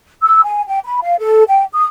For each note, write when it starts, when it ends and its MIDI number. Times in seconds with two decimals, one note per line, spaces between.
0.23 0.44 88
0.44 0.62 80
0.68 0.79 79
0.84 1.01 83
1.02 1.16 77
1.19 1.44 69
1.48 1.64 79
1.73 1.86 87